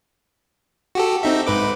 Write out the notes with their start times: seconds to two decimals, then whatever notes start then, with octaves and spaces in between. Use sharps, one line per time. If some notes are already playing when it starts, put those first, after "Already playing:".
0.95 F#4 G4 A4
1.23 C4 D#4 E5
1.47 G#2 B4 D6